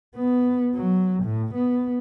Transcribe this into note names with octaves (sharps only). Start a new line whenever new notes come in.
B3
F#3
A2
B3